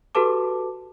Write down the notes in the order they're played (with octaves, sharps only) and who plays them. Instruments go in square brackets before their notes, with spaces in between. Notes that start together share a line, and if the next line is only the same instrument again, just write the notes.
[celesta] F#4 G4 A4 B4 A5 D6